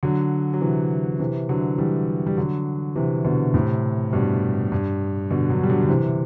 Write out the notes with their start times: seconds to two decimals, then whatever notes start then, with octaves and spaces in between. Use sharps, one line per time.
0.03 D3 F#3
0.53 F#3
0.61 C3 E3
1.20 C3 E3
1.49 D3 F#3
1.78 E3 G3
2.26 G3
2.37 D3 F#3
2.96 C3 E3
3.25 B2 D3
3.54 A2 C3
4.13 G2 B2
4.72 G2
5.31 B2 D3
5.50 D3 F#3
5.63 G3
5.70 D3 F#3
5.82 D3
5.89 C3 E3